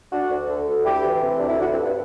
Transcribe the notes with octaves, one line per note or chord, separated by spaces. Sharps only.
D3 D4 F#4
D2
D3
D2
D2 E4 G4
E3
C3
D2 D4
E4
E3 D4 F#4
C4 E4
G2
B3 D4